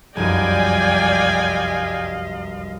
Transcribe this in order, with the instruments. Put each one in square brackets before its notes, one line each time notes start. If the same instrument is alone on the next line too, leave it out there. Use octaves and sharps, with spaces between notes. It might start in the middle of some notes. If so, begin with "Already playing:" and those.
[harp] F1 C2 F#2 [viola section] D5 G5 G#5 [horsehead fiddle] D#5 F5